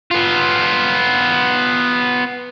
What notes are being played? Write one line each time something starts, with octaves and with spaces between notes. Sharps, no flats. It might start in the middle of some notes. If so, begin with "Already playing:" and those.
B3 F4